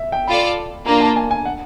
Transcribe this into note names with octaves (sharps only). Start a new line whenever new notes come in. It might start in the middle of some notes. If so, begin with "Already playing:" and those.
Already playing: E5
G5
F4 A4 D5 B5
A#3 D4 F4 A#5
A5
G#5
G#5
F#5